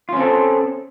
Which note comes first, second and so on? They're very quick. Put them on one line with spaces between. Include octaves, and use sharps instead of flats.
F4 C#4 C4 A4